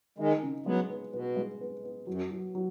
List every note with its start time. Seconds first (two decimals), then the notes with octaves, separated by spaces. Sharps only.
0.18 D#3 G#3 D#4
0.43 C#3
0.66 F#3 G#3 B3
0.90 B3
1.13 B2 B3
1.36 G#3
1.61 B3
1.85 B3
2.07 F#2 F#3
2.30 F#3
2.55 F#3